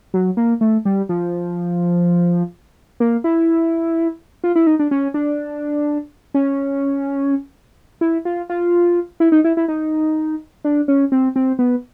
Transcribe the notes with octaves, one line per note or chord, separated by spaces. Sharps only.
F#3
A#3
A3
G3
F3
A#3
E4
F4
E4
D#4
D4
C#4
D4
C#4
E4
F4
F4
E4
D#4
E4
E4
D#4
D4
C#4
C4
C4
B3